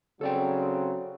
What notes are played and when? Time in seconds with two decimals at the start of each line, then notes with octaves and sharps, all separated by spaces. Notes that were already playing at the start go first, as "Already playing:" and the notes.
0.21 C#3 F#3 C4 A4 D5 G5